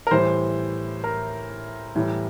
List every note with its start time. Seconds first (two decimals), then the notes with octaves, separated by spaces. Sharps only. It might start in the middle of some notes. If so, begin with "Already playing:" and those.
0.07 A#4
0.11 A2 E3 G3 C5
1.04 A#4
1.95 A2 E3 G3